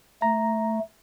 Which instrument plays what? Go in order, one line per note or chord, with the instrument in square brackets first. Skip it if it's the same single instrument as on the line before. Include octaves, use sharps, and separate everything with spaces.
[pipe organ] A3 [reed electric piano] A#5